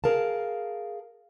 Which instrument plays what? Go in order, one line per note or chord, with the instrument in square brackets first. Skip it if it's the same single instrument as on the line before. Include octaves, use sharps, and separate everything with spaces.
[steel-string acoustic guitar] G#4 A#4 F5 A5